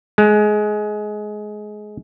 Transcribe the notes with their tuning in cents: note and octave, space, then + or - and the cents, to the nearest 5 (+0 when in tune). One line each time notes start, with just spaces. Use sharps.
G#3 +20